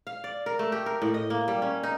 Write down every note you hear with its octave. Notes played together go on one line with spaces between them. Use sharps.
F5
D5
A#4
A3
G4
A#4
A2
D#5
A#3
G3
C#4
D#4